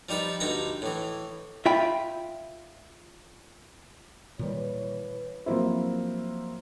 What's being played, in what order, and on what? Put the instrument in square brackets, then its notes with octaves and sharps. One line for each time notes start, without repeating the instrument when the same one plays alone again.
[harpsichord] F3 G3 D#4 B4
D2 G2 D3 D#4 G5 A#5
A2 E3
[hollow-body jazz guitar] F4 E5 G5 B5
[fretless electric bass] A#2 D#3 G3 [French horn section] E3 B4 C#5
[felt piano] F3 F#3 A#3 C4 E4